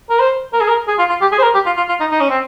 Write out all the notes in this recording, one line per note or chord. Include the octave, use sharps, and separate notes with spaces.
A#4
C5
A#4
G#4
A#4
G#4
F4
F4
G4
G#4
C5
A#4
G4
F4
F4
F4
D#4
D#4
C#4
C4